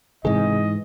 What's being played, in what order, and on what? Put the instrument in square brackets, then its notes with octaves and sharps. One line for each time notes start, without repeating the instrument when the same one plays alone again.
[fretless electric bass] G#2 E3 [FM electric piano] C3 G#4 [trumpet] D#5